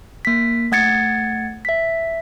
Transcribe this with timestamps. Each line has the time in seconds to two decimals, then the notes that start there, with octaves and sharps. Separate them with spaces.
0.25 A#3 B6
0.72 A3 F#5 G#6 A6 C#7
1.65 E5 B6